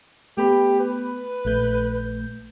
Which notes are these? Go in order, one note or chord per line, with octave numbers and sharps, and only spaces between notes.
A3 B3 G4 B5
B4
A#1 A3 G6